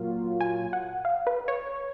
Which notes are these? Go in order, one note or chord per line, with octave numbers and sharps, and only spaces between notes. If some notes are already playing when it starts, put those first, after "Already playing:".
Already playing: A#2 F#3 A#3 F4 F5
G#5
F#5
F5
B4
C#5